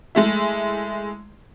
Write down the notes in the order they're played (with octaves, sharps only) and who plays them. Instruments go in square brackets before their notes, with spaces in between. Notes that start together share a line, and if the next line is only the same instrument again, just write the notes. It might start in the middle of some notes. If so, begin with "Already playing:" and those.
[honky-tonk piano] G#3 A3 E4